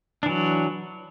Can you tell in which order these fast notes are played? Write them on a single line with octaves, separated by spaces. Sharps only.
D4 E3 F#3